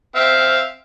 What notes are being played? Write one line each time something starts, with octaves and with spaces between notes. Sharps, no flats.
C4 E5 F5